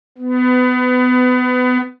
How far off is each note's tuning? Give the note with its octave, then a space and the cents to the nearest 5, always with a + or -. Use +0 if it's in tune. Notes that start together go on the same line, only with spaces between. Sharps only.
B3 +25